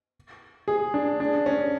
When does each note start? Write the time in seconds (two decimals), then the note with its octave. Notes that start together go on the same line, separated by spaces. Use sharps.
0.68 G#4
0.94 D4
1.20 D4
1.46 C#4